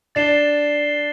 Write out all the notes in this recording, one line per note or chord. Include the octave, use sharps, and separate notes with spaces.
D4 A6 C7 E7 G7